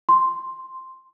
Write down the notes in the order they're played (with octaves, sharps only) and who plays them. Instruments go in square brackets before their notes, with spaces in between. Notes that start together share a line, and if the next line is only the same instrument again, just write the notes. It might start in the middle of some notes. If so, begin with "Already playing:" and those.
[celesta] C6